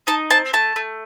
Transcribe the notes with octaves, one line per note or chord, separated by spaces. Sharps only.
D#4 A5
C4 A5
A3 A5
A3